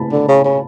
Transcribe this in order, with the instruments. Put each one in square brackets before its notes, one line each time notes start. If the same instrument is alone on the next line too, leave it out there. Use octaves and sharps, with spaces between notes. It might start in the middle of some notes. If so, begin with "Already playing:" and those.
Already playing: [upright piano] A5 B5
[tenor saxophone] D3
C#3
C#3